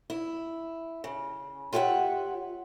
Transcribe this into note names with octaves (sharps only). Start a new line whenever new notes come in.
E4
C#3
F4 G4 C#5 E5 F#5